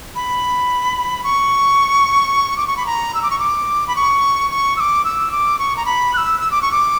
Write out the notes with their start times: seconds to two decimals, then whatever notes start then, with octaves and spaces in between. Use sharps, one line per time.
0.15 B5
1.24 C#6
2.57 D6
2.67 C#6
2.77 B5
2.86 A#5
3.15 E6
3.23 D6
3.31 C#6
3.39 D6
3.88 B5
3.96 C#6
4.51 C#6
4.77 E6
4.80 D6
5.05 E6
5.31 D6
5.59 C#6
5.77 A#5
5.86 B5
6.14 F#6
6.17 E6
6.40 E6
6.51 D6
6.62 C#6
6.72 D6